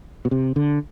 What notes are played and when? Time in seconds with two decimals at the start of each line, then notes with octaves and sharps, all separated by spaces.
0.25 B2
0.31 C3
0.56 D3